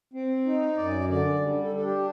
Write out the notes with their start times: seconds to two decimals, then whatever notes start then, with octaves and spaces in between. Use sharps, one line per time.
0.14 C4
0.45 D#4
0.77 F#2 D5
1.09 D3 D5
1.41 G3
1.63 A4
1.73 D4 A4
1.84 G4